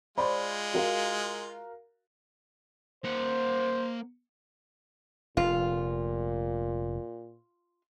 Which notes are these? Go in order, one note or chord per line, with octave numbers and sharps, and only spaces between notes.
G#3 F4 C5 D5 B5
F#4 A#4 F5
A#3 C5 F#5
F1 A#2 F4